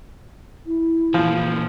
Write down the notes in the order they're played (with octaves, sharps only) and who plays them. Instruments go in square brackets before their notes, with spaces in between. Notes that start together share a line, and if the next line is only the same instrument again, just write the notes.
[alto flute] E4
[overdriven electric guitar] A#2 E3 [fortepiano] F3